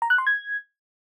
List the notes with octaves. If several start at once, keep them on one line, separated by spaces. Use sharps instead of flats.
A#5
F#6
C6
G#6